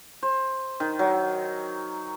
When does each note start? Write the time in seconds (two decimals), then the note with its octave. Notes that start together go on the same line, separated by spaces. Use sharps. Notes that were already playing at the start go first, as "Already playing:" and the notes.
0.23 C5
0.80 D#3
0.99 F#3